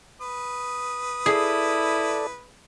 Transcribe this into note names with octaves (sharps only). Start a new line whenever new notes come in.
B4 D#6
E4 G#4 A4 D5